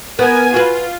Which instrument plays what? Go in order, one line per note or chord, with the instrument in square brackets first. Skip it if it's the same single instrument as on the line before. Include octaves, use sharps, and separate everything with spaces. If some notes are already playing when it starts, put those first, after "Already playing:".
[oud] B3 [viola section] A#4 G#5
[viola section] F4 [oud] F#4 B4